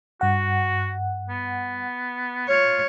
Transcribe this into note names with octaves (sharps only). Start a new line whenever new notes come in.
G2 F#4 F#5
B3
F4 C#5